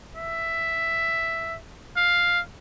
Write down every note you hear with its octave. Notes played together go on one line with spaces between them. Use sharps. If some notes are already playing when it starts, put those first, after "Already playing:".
E5
F5